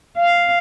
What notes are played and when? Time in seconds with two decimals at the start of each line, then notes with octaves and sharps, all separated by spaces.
0.17 F5